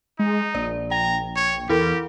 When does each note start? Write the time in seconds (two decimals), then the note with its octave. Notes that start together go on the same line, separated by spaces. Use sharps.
0.19 G#3 D#4
0.55 A#1 D5
0.91 G5 A#5
1.36 C#5
1.69 E2 E4 G4 A4 A#4